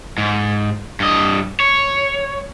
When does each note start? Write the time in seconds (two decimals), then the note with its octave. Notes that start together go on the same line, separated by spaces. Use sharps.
0.18 G#2
1.00 G2 D#5
1.60 C#5